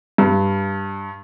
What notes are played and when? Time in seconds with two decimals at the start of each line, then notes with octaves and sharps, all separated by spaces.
0.18 G2